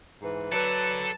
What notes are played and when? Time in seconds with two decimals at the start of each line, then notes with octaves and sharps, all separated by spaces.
0.22 G#2 E3 B4
0.52 F#3 A4 B4 D5 A5